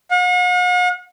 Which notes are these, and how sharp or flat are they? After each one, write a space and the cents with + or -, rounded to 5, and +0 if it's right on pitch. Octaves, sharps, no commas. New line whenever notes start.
F#5 -45